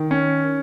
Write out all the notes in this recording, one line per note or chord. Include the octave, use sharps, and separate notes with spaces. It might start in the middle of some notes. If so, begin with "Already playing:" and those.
Already playing: D#3
C#4